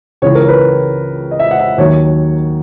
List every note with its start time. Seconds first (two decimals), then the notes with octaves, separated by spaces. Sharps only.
0.22 C#2 C#3 E3 C#5
0.35 A#4
0.44 C#5
0.49 B4
1.31 D#5
1.40 E5
1.51 F#5
1.59 E5
1.78 D#2 D#3 F#3 C#5